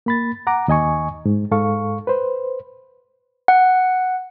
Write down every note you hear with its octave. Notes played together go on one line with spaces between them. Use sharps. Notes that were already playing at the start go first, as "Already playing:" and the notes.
A#3 B5 A6
F#5 A#5 D6
D#2 D#5 G#5 C#6
G#2
G#2 A4 F5 C#6
B4 C5
F#5